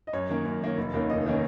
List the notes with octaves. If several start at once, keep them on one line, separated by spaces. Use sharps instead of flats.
D#5
F#2 C#5
D#3 A#3 C#4
F#2
D#3 A#3 C#4
F1
D#2 D#3 A#3 C#4
F1 D#5
D#3 A#3 C#4